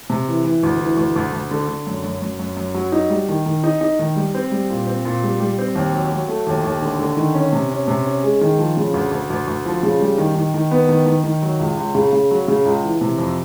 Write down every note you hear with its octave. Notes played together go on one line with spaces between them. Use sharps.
C3
E3
E3
D2
E3
D2
D2
D2
D3
D3
F#2
F#2
F#2
F#2
F#2
F#3
D#4
G3
D#3
D#3
D#4
D#4
D#3
G3
C4
G3
A#2
C4
A#2
G3
G3
C4
D#2
F#3
F#3
A3
D#2
D#2
D3
D3
D#3
C#4
C3
C#4
C3
C#4
G#3
D#3
F3
C#3
D2
D2
D2
D2
F3
C#3
G3
D#3
D#3
D#3
B3
D#3
D#3
D#3
F#3
C#2
C#2
C#3
C#3
F#3
C#3
C#2
E3
C3
F2